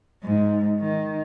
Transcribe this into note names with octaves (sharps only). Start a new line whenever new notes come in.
G#2
D#3